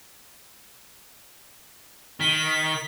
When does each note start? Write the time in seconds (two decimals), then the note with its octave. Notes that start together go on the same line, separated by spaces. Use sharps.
2.20 D#3 B6